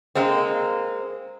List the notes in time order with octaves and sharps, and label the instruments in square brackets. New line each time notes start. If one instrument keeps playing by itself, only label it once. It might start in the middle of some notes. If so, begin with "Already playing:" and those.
[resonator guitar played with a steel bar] G#3 A#3 C4